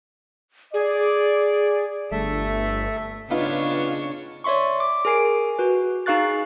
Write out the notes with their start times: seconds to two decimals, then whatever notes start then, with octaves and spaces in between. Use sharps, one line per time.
0.74 G#4 D5
2.11 G1 A3 A4 E5
3.30 C#3 B3 D4 D#4 F4 C#5
4.44 C#5 D5 E5 C6 C#6
4.80 D6
5.05 G#4 A#4 G#5 C7 D7
5.59 F#4 B4
6.06 D#4 G#4 F5 C#6 F#6 A6